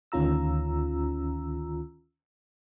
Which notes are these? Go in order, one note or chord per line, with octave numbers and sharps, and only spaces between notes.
D2 D#3 C#4 F4 A#5 E6